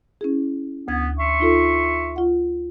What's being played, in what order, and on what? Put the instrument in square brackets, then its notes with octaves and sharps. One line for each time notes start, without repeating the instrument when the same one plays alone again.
[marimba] C#4 E4 G#4
[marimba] D2 G#6 [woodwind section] B3
[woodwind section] E5 C6 C#6
[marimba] D#4 F4 A4
F4 F#5